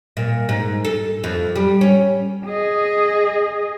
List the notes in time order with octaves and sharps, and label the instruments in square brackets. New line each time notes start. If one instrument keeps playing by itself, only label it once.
[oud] A#2
G#2
A4
F2
G3
C#4
[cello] G#4 D#5